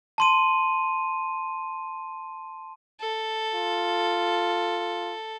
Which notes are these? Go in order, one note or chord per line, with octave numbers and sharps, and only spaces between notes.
A5 C6 D#7
A4
F4